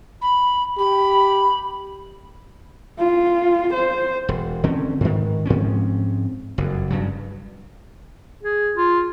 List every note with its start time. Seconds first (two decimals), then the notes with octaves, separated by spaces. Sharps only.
0.21 B5
0.78 G4 B5
2.99 F4
3.73 C5
4.29 E1
4.64 D3 C4 C#4
5.01 G#2 D#3
5.46 G#2 F3 C4 C#4
6.58 F#1 F2
6.90 G2 C#3 F#3
8.43 G#4
8.77 F4